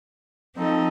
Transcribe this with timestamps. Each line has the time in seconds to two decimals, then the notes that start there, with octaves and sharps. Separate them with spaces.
0.54 F3 C4 D#4 A4